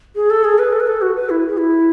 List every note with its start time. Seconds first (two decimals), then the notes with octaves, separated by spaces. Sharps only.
0.16 G#4
0.30 A4
0.44 G#4
0.59 B4
0.73 A4
0.80 B4
0.87 A4
1.02 F#4
1.16 B4
1.30 E4
1.49 G#4
1.58 E4